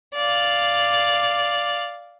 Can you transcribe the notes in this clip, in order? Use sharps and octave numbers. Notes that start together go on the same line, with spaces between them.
D5 F5